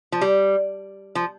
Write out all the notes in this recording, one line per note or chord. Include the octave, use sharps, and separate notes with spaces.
F3
G3
F3